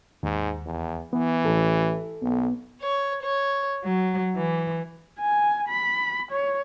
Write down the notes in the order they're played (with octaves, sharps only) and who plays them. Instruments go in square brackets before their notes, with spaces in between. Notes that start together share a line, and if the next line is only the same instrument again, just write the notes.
[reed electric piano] D#2 [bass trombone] G#2
[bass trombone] E2
[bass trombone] E3 [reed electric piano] B3
[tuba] A1 [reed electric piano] A4
[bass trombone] B1 [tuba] B3
[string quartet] C#5
C#5
F#3
E3
[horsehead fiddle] G#5
B5
C#5